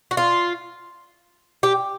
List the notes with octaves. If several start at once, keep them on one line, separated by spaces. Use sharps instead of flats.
F#4
F4
G4